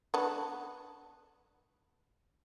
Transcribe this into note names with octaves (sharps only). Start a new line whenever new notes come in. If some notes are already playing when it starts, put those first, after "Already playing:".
B3 D4